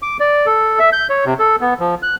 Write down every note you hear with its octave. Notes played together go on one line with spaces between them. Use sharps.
D6
D5
A4
E5
G6
C#5
C3
A4
B3
F3
F#6